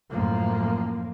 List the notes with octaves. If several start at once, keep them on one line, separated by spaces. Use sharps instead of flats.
F#2 A2 F3 A#3